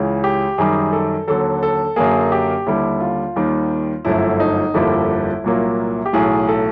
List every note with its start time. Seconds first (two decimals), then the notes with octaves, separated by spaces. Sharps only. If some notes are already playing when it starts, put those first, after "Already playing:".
Already playing: C#2 C#3 E3
0.24 G4
0.58 F#2 D#3 G3 G#4
0.93 A4
1.27 D#2 D3 F#3 A4
1.63 A4
1.96 F#2 D3 F#3 A#3 G#4
2.32 G4
2.66 D#2 D3 G3 E4
3.00 F4
3.36 D#2 D#3 G3
4.05 G1 F#2 D3 F3 A3 E4
4.40 D#4
4.74 G1 F2 D3 G3 A#3 E4
5.44 C2 A#2 F#3 A#3
6.06 G4
6.13 B1 A2 E3 G#4
6.49 A4